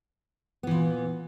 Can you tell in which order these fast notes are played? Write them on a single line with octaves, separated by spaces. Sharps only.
B3 E3 A#2